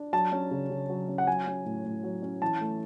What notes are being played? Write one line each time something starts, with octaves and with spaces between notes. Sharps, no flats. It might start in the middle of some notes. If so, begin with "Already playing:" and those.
Already playing: D4
F#3 A5
C#4
C#3
C#3
F#3
C#4
F#5
F#3 G#5
C#4
A2
A2
F#3
C#4
E3 A5
A3